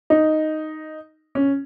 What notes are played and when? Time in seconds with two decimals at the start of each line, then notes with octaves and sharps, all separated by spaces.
0.10 D#4
1.35 C#4